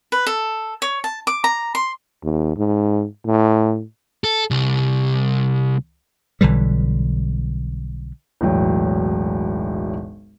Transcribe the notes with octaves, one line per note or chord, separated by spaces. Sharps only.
B4
A4
C#5
A5
D6
A#5
C6
D#2
G#2
A2
A4
C2
B1 D3 E3 G3
E1 B1 A2 F#3 G5